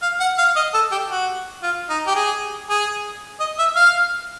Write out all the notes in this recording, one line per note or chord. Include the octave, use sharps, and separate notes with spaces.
F5
F#5
F5
D#5
A4
G4
F#4
F4
D#4
G4
G#4
G#4
D#5
E5
F5